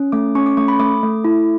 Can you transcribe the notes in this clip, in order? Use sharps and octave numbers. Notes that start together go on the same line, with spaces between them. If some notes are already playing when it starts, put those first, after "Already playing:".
Already playing: C#4
A3 D6
C#4 C#6
D6
A3 C#6
B5
A3 D6
A3
E4